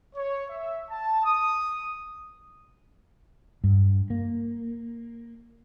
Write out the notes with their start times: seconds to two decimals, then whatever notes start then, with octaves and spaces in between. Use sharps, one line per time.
0.16 C#5
0.50 E5
0.90 A5
1.24 D#6
3.64 G2
4.10 A#3